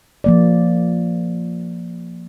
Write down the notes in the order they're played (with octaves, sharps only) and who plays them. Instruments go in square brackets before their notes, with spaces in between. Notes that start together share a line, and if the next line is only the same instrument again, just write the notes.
[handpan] F3 A#3 D5